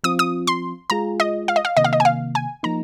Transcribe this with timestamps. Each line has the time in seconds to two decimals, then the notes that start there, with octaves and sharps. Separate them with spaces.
0.04 F3 C4 F4 D#6
0.19 D#6
0.47 C6
0.90 G#3 F4 G#4 A#5
1.20 D#5
1.48 F5
1.56 D#5
1.65 F5
1.77 C3 D#3 A#3 D#5
1.84 F5
1.93 D#5
2.00 G#5
2.05 F5
2.35 G#5
2.63 F3 A#3 D#4 A#5